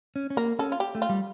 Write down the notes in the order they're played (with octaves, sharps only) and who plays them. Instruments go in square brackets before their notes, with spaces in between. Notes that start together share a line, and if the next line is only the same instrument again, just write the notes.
[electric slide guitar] C#4
C#4
[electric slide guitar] A#3 [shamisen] A#4
[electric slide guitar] C#4 [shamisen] A4
[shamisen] F4
G4
[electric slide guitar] A3
[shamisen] F4
[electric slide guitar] G3